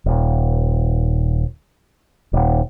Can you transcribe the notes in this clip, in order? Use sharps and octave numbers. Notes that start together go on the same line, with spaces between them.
D#1
D#1